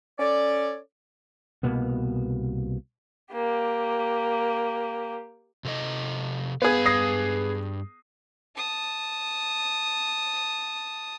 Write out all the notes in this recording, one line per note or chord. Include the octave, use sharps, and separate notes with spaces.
C#4 A4 C#5 D5
C2 B2 A#3 B3
A#3 G4
C3 A4 D#5
G2 B3 G#4 F5
D#6 A#6 C7
A5 D#6